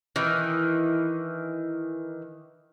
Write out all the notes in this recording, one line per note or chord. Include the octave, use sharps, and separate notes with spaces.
D#3 E3